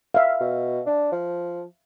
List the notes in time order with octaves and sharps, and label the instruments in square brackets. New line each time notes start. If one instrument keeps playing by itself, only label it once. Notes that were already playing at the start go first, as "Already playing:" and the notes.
[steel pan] E5 F5
[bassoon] B2
D4
F3